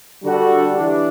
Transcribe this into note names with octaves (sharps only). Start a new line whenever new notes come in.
D3 G3 D4 F#4 A4
E3 G3 D4